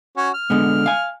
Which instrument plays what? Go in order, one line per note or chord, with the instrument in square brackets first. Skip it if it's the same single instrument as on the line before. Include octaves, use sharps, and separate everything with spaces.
[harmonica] C#4 F#4
F6
[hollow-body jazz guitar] D3 G#3 B3
F5 G#5